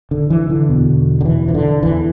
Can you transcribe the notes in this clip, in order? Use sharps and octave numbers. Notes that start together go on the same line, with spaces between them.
D3
E3
D3
E2 B2
D3
E3
E3
D3
E2 D3 E3